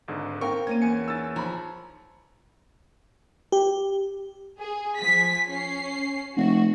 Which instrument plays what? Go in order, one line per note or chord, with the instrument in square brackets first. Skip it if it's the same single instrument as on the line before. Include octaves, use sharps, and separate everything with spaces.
[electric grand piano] G#1 G#2 D3
[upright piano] C4 F5 G5 [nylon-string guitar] A#4 [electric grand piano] C#6
[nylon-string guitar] A#3 C#4 [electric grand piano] G#6 D#7
[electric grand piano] E2 G#5 C#7
[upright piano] E6 A6
[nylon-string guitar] F3 [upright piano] A#5 B5
[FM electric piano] G4
[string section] G#4
F3 G#5 B6
C#4 C7
[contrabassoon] F1 [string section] F#4